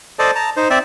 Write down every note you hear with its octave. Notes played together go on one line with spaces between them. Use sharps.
A4 C5 D5 D#5 A5
A5 A#5
D#4 C5
C4 D5 E5